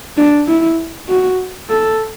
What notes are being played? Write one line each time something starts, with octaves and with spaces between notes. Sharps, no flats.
D4
E4
F#4
A4